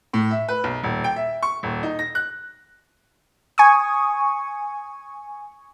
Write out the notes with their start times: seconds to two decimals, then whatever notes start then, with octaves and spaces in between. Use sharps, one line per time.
0.14 A2
0.31 E5
0.48 B4
0.64 B1
0.83 D#1
1.04 G5
1.16 E5
1.43 C#6
1.63 D#1
1.83 D#4
1.99 A#6
2.15 F#6
3.58 G#5 C#6 D#6